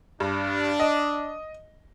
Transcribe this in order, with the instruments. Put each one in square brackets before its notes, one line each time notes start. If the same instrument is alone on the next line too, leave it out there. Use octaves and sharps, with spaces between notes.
[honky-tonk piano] G2 [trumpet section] D4
[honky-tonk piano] D#5